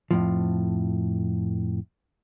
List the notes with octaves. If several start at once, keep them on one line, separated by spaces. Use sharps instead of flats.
F2 A2 F3